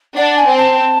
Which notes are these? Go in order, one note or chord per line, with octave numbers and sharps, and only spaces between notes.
D4 F#5
G#5
C4
A5